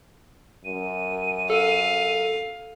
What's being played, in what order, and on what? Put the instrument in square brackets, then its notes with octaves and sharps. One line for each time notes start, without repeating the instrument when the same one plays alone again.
[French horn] F#2 [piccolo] D#7
[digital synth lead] A4 [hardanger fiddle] F5